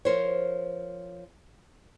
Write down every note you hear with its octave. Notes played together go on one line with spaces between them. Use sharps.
F3 A#4 C5 C#5